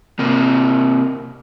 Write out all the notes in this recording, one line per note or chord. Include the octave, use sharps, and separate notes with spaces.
C3 A#3